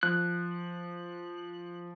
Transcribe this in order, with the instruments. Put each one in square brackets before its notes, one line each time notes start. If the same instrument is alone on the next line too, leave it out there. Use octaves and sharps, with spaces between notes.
[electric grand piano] F3 [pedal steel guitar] F#6